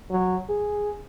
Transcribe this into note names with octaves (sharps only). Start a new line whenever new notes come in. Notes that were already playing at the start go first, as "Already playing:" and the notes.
F#3
G#4